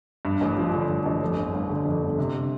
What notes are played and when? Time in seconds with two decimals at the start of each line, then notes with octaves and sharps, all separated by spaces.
0.25 G2
0.41 A1
0.58 F3
0.73 D3
0.89 G2
1.06 A1
1.22 F2
1.37 G1
1.53 G1
1.69 D3
1.86 F2
2.02 G1
2.18 C3